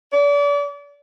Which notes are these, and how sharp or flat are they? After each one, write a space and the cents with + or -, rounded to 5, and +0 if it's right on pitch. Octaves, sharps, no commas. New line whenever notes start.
D5 -35